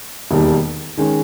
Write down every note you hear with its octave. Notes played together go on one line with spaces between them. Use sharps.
E1 D#2 D#3 G3
D#3 G#3 C#4